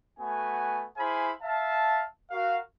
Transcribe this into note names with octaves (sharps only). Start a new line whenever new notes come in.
A3 B3 F#4 G#5
E4 G#4 C5 F5 G#5 B5
E5 F5 A5
F#4 A#4 F5